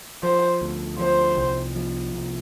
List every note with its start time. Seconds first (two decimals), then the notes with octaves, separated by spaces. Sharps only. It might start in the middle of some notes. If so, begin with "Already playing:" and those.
0.23 F3 C5
0.62 D2
0.99 F3 C5
1.37 C2
1.75 F3
2.14 C2